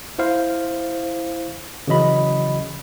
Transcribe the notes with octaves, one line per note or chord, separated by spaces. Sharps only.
E4 C5 F5
C#3 E3 F#3 D#5 B5